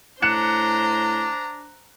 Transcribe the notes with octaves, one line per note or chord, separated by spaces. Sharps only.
A2 D4 C5 A#5 F#6 C#7 E7